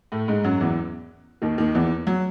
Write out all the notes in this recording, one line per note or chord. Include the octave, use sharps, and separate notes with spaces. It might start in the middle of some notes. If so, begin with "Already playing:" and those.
A2 A3
G#2 G#3
F#2 F#3
E2 E3
D#2 D#3
D#2 D#3
E2 E3
F#3